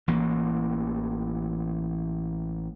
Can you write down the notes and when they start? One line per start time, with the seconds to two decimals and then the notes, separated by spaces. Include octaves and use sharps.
0.08 A1 E3 A#3